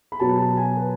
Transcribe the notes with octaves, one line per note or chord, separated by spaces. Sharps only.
B5
B2 F#3 B3 A5
A5
G#5
B4